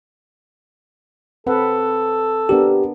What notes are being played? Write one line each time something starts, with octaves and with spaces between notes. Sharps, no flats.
C4 A4 B4 F#5
B3 D4 G4 A#4